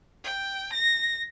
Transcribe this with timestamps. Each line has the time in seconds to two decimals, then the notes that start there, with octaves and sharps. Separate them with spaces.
0.25 G5
0.73 A#6